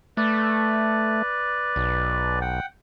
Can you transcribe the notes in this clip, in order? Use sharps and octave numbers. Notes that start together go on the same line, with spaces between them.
A3 B4 D5
B1
F#5 G5